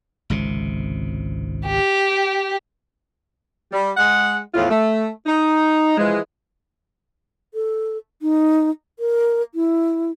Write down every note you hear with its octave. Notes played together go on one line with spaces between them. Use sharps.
G#1 C#2 C3
G4
G3
G#3 F#5
E2 A2 F3 F4
A3
D#4
E3 F3 G#3
A4
D#4
A#4
E4